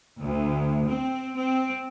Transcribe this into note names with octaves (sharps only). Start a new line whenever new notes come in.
D2
C4
C4